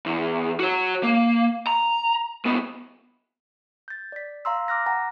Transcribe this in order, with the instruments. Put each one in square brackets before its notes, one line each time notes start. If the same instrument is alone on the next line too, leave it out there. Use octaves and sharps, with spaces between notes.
[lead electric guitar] E2
F#4 C#5
A#3
A#5
C2 B3
[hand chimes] G6 A6
D5 B6
F5 A#5 C6 E6
A#5 D6 F6 F#6 A#6
F#5 G#5 A#5 A#6